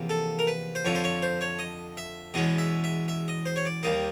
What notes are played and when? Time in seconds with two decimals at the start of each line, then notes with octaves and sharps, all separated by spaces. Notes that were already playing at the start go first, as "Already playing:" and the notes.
Already playing: E2 C3 F3 A#3
0.09 A4
0.39 A#4
0.47 B4
0.75 C5
0.85 F2 D3 F3 C#5
0.95 C5
1.04 C#5
1.22 C5
1.41 C#5
1.59 D#5
1.97 E5
2.34 E2 B2 G#3 C#4 D#5
2.58 E5
2.84 E5
3.08 E5
3.28 D#5
3.46 C5
3.56 C#5
3.65 D5
3.83 D#2 D#3 G3 A#3 D#5